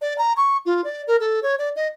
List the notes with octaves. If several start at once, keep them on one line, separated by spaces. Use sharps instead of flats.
D5
A#5
C#6
F4
D5
A#4
A4
C#5
D5
D#5